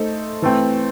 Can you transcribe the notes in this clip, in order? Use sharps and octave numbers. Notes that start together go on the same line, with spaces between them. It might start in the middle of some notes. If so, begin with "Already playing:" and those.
Already playing: A3 D#4 A4 C5
E3 A3 C4